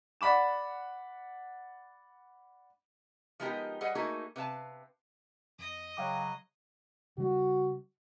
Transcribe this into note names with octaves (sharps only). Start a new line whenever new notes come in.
D5 F#5 B5 D6 E7
F3 G#3 B3 D#4 G4 A#4
G3 G#4 B4 D#5 F#5
A3 A#3 D#4 F#4 G#4 A#4
C3 B4 F5 A5
F2 D#5
C#3 F#3 F5 G5 D6
C#3 G3 F#4